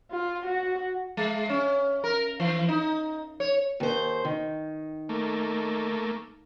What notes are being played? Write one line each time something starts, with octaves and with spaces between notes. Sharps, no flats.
F4
F#4
G#3
C#4
A#4
E3
D#4
C#5
D#2 C5
D#3
A3 A#3